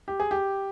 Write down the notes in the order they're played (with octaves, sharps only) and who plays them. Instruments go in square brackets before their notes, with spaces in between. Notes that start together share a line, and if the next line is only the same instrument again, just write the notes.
[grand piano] G4
G#4
G4